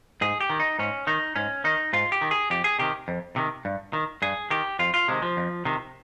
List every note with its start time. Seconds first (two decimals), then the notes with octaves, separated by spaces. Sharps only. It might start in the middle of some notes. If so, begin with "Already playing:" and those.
0.21 G#2 G#4
0.41 G4
0.50 D#3
0.60 D#4
0.79 G#2 C#4
1.07 D#3 D#4
1.36 G#2 C#4
1.64 D#3 D#4
1.93 G#2 F4
2.12 G4
2.21 D#3
2.31 G#4
2.50 F2 G4
2.64 G#4
2.79 C3 D#3 G4
3.08 F2
3.36 C3 D#3
3.65 G2
3.93 D#3
4.22 G2 G#4
4.51 D#3 G4
4.79 F2 F4
4.94 F4
5.08 C3 D#3 G#3
5.22 F3
5.37 F2
5.65 C3 D#3